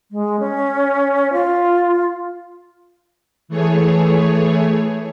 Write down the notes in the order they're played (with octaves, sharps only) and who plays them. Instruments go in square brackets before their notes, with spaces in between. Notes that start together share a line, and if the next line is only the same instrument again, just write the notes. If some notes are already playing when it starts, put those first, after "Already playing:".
[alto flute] G#3
C#4
F4
[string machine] E3 A3 G#4 C#5